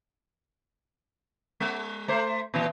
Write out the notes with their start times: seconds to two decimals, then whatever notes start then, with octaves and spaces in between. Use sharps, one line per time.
1.60 G#3
2.08 A3 C5
2.54 A#2 E3